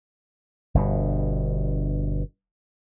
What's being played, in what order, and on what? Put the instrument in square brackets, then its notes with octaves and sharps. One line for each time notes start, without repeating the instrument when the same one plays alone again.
[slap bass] G1 G2 B2